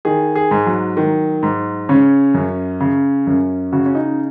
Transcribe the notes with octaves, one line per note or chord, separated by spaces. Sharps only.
D#3 G#4
G#4
G#2
F#3
D#3
G#2
C#3 C#4
F#2
C#3
F#2
C#3 F#4
C#4
D#4